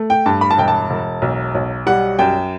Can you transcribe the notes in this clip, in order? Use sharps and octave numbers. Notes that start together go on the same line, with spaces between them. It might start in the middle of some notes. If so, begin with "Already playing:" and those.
Already playing: A3
G5
G2 A5
B5
A5
E1 G5
A5
E1
B1
B1
G3 F#5
F#2 G5